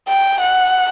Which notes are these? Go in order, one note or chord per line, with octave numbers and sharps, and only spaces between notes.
G5
F#5